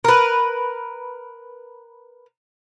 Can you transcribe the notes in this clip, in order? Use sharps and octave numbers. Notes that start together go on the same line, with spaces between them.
A#4 B4